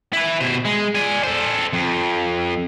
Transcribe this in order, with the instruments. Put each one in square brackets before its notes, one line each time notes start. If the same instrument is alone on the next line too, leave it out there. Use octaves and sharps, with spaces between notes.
[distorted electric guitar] E4 B4
B2 C5
G#3
D5 G#5
A4 C5
F2